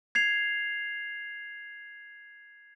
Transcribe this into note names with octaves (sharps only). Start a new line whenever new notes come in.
G#6 C7 F7